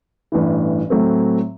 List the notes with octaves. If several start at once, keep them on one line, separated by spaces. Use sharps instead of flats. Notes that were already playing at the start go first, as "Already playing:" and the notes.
A1 G2 E3
A2 F#3 A3 C4